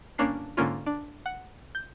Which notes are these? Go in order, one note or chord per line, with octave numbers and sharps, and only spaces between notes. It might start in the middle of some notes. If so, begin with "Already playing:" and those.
G1 A#3 C#4 D4 C7
G#2 D3 A#3 C#4 F4
D4
F#5
G6